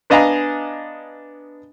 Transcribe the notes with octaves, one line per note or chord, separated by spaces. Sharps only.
B3 D4 D#5 F5 G#5 A#5